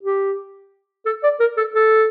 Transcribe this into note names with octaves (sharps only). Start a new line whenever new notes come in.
G4
A4
D5
A#4
A4
A4